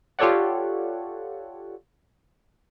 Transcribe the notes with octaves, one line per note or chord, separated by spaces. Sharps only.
F4 G4 A4 C#5 D5 F#5